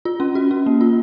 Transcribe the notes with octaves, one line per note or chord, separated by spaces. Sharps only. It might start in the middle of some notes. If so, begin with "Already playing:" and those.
F4
C#4
F#4
C#4
A#3
F4